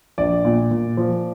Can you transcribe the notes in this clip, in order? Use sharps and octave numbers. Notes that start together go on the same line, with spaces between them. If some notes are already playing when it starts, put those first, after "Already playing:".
A#1 D5
A#2
A#2
F3